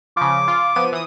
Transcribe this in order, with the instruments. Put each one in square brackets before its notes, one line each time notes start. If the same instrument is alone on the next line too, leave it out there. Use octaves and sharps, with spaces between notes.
[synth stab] C#3 F3 [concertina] D6
[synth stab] F4
F3 B3 D#7
E3 D#6